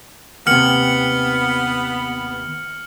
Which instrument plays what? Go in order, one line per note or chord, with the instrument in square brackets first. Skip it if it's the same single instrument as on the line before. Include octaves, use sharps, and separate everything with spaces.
[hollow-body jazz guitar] D#2 C3 [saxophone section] B3 [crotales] F6 C#7 F#7